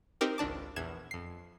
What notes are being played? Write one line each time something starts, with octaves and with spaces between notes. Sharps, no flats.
C4 D#4 G4 A#4
G#1 C#2 D4 A5 D6
A#1 E2 G#6 E7
F2 C7